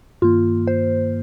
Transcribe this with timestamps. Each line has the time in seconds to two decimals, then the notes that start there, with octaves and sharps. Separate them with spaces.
0.22 G2 D#3 A#3 F4
0.67 C5